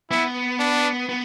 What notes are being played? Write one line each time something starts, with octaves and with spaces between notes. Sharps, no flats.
B3 E4
D4
B3